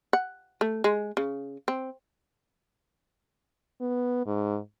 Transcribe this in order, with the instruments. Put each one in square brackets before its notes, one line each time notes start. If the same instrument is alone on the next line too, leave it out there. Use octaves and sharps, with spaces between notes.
[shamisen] F#5
A3
G#3
C#3
C4
[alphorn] B3
G#2